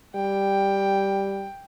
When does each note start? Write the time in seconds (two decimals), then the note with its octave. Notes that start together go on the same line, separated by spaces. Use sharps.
0.16 G3 G5